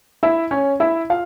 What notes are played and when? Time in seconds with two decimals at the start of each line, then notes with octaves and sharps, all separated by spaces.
0.23 E4 E5
0.51 C#4 C#5
0.80 E4 E5
1.10 F4 F5